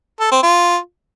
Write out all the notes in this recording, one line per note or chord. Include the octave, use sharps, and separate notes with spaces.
A4
C4
F4